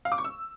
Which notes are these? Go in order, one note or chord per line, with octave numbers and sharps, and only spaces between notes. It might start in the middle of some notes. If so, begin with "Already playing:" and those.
F5
D6
C#6
E6